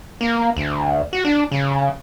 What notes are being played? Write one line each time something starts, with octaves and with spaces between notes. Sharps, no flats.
A#3
D2
F#4
D4
C#3